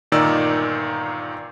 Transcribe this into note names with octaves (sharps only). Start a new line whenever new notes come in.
G1 A#2 D#3 D#4 D5 E6